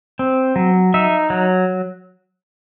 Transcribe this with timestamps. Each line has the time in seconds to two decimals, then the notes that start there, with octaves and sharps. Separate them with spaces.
0.19 C4
0.56 F#3
0.94 D#4 E5
1.30 F#3